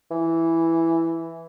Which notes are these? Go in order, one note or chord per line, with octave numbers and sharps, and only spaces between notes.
E3